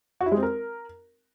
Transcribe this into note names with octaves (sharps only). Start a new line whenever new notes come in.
F#4
E4
G#3
C4
A#4